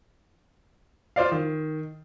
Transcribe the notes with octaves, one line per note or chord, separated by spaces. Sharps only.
F4 C5 D5 F5
D#3